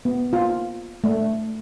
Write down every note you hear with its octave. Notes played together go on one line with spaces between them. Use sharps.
B3
F4
A3